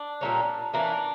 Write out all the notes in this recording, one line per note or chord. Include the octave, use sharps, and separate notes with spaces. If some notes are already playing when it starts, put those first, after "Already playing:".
Already playing: D4
A#2 G3 A#3 C#4
E3 A#3 C#4 D4